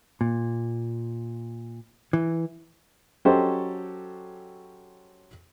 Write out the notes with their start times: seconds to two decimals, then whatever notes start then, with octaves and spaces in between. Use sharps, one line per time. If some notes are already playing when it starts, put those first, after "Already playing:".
0.21 A#2
2.13 E3
3.25 F#3 C#4 G4 A4 C5 D#5